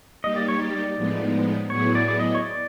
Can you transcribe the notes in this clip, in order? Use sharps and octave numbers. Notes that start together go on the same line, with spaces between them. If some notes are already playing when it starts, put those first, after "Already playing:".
G3 A#3 D#4 G4 D#5
D5
C#5
D5
A2 F3 G#3 B3 D#4
A2 F#3 B3 E4 G#4 C#5
D5
D5
D#5
C#5
D5